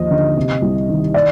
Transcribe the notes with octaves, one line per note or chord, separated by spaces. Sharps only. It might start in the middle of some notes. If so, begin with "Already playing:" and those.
Already playing: D#2 F3 D#5
D3
C3
C2
D#3
D5